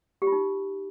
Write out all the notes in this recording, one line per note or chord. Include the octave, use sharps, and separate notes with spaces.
G4
F4
D#4